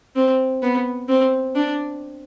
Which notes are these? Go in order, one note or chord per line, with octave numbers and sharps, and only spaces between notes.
C4
B3
C4
D4